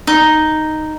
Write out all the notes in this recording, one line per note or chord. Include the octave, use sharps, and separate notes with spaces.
D#4